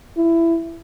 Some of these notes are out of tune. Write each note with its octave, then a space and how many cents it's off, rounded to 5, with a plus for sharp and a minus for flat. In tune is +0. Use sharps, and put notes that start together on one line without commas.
E4 +15